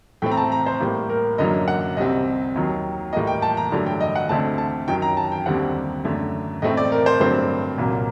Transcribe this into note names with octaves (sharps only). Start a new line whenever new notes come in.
A2 A3 C4 G5
A#5
A5
A#5
C5
A2 G3 A#3
A#4
F#2 D3 F#3 A#3 D#5
F#5
C2 C3 G3 C4 D#5
D#2 D#3 F#3
A2 G3 A#3 D#5
G5
A5
A#5
G2 D3 F#3 A3
G5
D#5
F#5
D2 D3 A3 C4 A5
A5
F#2 D#3 F#3 G5
A#5
A5
G5
D#2 D3 G3 C4 F#5
F#2 D3 A3
A2 A3 C4 D#5
D5
A#4
C5
G2 D3 F#3 A3 C4 C5
C2 A#2 F#3 A#3